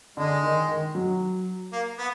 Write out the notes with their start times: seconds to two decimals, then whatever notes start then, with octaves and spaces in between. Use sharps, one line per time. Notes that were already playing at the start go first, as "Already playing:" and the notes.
0.17 D3 G#3
0.43 D#3
0.69 D#3
0.95 F#3
1.72 A#3
1.99 B3